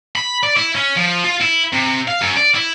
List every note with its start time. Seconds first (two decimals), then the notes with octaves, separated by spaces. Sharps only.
0.16 B5
0.43 D5
0.57 E4
0.75 C#4
0.97 F3
1.24 F4
1.40 E4
1.72 C3
2.08 F5
2.21 F#2
2.37 D5
2.55 E4